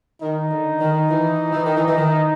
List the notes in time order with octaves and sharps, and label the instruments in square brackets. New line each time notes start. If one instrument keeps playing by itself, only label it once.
[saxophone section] D#3 [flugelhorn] D#4
[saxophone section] D3
D#3
E3
E3
D#3
E3
E3
D#3